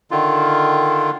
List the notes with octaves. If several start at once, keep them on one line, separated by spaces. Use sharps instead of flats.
D3 D#3 F4